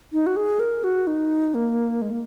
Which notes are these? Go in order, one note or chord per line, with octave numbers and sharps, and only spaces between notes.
D#4
F#4
G#4
A#4
F#4
D#4
A#3
G#3
A#3